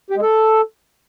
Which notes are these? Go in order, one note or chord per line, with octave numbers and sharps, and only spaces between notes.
G4
G#3
A4